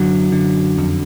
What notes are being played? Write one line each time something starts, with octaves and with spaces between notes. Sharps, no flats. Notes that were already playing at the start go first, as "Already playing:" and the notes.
Already playing: F#2 D3 F#3
D3
F2